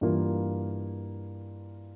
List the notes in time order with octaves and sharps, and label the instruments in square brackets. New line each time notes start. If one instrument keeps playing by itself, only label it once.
[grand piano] G2 E3 A#3 F4 A#4